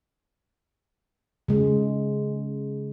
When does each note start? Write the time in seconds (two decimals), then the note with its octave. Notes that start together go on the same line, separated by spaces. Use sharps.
1.48 C#3 G#3